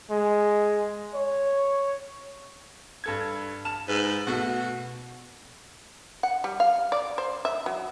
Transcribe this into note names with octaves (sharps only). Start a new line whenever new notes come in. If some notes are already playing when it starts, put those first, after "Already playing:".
G#3
C#5
G2 A4 G#6
A5 F6 E7
G#2 B4
B2 A3 F#4
F#5
G3
F5
D5
C5
E5
F#3